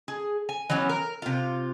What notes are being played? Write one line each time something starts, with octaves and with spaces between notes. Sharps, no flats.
G#4
G#5
E3 F#3 B3 C#4
A#4
C3 F4